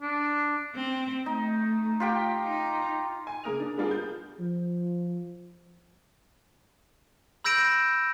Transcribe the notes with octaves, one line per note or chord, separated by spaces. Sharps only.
D4
C4
A3 D#4
F4 G4 G5
D#4
G#5
C#3 A#3 A#4 D#6 F7
D4
G3 B3 D4 F4 G#4 A#4
G6
F3
B5 E6 G6 A#6 D7 E7